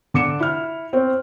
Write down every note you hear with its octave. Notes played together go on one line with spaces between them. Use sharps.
D3 D6 C#7 E7
E4 F6
C4 C#5